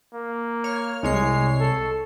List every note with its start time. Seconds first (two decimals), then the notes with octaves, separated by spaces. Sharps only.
0.14 A#3
0.64 C#5 F6
1.03 C2 G#3 C#5 C7
1.60 A4